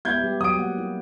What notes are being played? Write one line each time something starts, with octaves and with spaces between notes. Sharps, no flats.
G#3 B3 E4 G4 G6 G#6
G3 G4
F#3 D#6 D7
A#3 F#5
E4